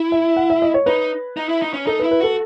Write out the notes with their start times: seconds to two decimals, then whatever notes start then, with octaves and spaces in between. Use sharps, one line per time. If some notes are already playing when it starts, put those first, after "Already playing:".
Already playing: E4
0.12 E5
0.36 F#5
0.50 E5
0.62 D#5
0.74 C#5
0.86 D#4 B4
1.37 D#4
1.49 E4
1.62 D#4
1.73 C#4
1.87 D#4 A4
1.99 B4
2.03 E4
2.11 B4
2.20 F#4 A4